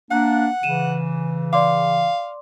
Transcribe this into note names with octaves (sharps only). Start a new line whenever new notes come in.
A#3 D4 F#5 F#6
C#3 E3 D#7 E7
D5 F5 C6 D6